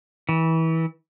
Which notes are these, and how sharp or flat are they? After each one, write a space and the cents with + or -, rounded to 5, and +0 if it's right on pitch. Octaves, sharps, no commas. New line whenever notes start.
E3 -25